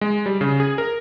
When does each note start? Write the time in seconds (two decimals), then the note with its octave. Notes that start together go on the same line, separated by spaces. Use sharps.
0.01 G#3
0.26 G3
0.41 C#3
0.60 G#4
0.78 A#4